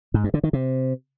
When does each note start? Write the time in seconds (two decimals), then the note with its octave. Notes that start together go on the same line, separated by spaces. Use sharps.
0.14 G#2
0.24 G2
0.34 D3
0.44 D#3
0.53 C3